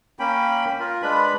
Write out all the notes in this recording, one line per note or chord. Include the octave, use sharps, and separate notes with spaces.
A#3 C#4 G5 B5
F4 A#4
G#3 D4 B4 B5